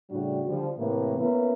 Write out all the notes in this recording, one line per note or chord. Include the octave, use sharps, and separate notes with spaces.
A2 C#3 G3 D4 F#4
D3 F3 G3
A2 C3 E3 A3 A#3
A#3 B3 C#4 E4 A#4 B4